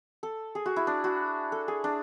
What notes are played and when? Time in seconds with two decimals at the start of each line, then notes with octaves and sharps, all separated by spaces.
0.23 A4
0.55 G#4
0.66 F#4
0.76 E4
0.87 D4
1.04 F#4
1.52 A4
1.68 G#4
1.84 D4